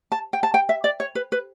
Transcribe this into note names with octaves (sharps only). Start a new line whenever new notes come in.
A5
G5
A5
G5
E5
D5
C#5
B4
B4